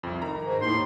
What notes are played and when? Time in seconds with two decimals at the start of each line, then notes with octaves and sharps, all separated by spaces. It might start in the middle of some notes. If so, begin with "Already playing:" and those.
0.03 C2 F2
0.22 D#3 A#5
0.42 G#2
0.62 D#2 A2 C6